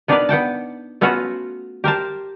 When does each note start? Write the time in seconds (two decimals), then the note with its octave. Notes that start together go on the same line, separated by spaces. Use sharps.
0.08 B3 D4 D#4 A#4 B4 D5
0.29 B3 F#5 G5 A5
1.01 A3 B3 C#4 F4 F#4
1.84 G4 A#4 C5 A5